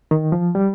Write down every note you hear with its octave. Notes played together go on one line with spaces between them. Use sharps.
D#3
F3
G3